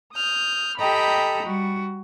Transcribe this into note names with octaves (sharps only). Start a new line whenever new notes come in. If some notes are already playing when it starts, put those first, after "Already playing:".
D#6 F6 G6
G4 A4 D#5 G5 A#5 B5
G3 F#4